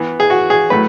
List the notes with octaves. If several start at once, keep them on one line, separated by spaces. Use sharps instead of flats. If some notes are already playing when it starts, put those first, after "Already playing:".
Already playing: E3 B3
G#4
F#4
G#4
A2 F#3 A3 B4